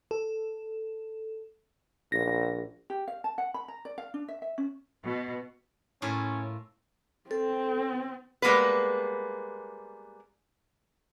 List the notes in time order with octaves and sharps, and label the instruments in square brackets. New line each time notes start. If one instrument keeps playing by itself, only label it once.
[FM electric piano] A4
[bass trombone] A#1 [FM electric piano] A#6
[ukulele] G4
F5
A5
F#5
B5
A#5
D5
F5
D4
E5
E5
C#4
[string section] B2
[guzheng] A2 A#3 F4 [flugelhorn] C#4
[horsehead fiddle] C4 [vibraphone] A4
[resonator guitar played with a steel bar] G3 G#3 A#3 B3 B4